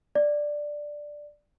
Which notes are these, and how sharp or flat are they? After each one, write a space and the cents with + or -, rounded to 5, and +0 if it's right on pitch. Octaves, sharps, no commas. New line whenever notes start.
D5 +5